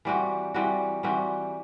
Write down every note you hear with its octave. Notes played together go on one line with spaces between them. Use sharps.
E3 G3 C4 F#4
E3 G3 C4 F#4
E3 G3 C4 F#4